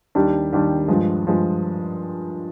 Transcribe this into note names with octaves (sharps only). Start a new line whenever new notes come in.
D#2 D#3 G3 D4 G4
D#2 D#3 G3 D4 G4
G2 F3 G#3
G2 F3 G#3